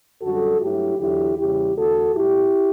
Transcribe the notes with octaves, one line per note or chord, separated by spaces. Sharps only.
F#2 D3 G3 F#4 A4
G2 F#3 A3 E4 G4
E2 D3 F#3 E4 G4
E2 C#3 G3 E4 G4
E2 D3 A3 F#4 A4
A2 G3 E4 G4